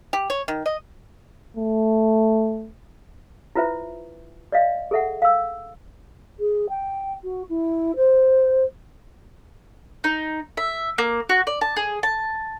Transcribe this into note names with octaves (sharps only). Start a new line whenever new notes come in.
G4
C#5
D#3
D#5
A3
E4 F4 B4 C5 E5
D5 D#5 F5
G#4 A4 E5 F#5
F5 E6
G#4
G5
F#4
E4
C5
D#4
E5
A#3
F#4
D5
A5
G#4
A5